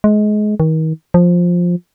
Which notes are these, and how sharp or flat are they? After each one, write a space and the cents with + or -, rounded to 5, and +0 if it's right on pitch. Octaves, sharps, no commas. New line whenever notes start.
G#3 +25
D#3 +35
F3 +10